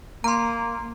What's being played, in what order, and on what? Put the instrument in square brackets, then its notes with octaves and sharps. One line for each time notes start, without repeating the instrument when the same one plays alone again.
[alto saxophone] A#3 [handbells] A#5 C6